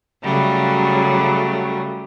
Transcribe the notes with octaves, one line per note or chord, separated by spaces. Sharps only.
C#3 F#3 G3 A3